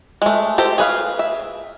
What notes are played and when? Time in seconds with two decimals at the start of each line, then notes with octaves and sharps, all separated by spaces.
0.22 G#3 A3
0.58 G4 A4 C5
0.78 G#4 B4 F5
1.19 E5